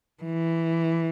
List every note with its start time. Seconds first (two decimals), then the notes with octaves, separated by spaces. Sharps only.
0.24 E3